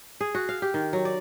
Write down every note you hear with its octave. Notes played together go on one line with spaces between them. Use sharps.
G#4
F#4
F5
G4
D#3
F#3
D5